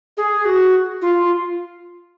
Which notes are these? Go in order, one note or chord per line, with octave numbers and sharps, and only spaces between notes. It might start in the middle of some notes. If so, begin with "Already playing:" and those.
G#4
F#4
F4